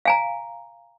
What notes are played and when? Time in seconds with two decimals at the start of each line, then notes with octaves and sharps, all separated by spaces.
0.05 F5 G#5 A#5